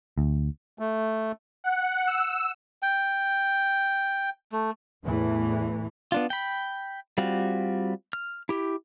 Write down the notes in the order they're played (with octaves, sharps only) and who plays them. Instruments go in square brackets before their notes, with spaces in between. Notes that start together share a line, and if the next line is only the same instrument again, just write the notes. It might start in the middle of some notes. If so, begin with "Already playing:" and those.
[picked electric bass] D2
[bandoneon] A3
[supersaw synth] F#5
E6
[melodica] G5
A3
[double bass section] E2 A2 E3 A3
[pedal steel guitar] B3 D4 F4
G5 B5
G3 C4 F4 F#4
F6
E4 G4